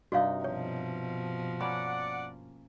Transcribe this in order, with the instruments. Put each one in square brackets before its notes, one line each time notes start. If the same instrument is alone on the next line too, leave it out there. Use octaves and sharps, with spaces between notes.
[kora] G2 C3 D#4 [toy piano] F#4 D#5 F5
[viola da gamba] B2 F3 [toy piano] C#5
[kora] A#3 C#4 [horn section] D5 F#5 [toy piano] B5